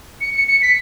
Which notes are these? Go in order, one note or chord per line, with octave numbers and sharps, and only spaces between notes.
C#7
C#7
C#7
B6